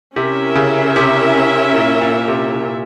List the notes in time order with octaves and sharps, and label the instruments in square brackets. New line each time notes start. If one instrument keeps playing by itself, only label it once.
[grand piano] C3 [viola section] C#4 E4 A#4 E5
[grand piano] C#3
C3
A#2
A#2
C3
C3
A#2